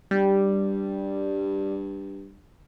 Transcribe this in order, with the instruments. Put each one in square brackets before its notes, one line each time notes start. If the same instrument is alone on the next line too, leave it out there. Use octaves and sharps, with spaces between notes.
[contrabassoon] G2 [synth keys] G3